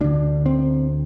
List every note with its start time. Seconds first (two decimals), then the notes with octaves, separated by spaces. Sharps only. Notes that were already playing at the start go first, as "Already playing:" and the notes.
0.01 D2 D3 D4
0.46 C4